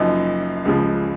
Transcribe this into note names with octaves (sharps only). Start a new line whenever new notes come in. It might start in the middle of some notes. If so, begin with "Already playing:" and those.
Already playing: F#1 F#2 F3 D#4
C#2 C#3 F3